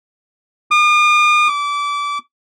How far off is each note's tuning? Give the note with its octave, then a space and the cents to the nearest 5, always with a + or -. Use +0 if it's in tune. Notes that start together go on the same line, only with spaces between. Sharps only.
D#6 -45
D6 -25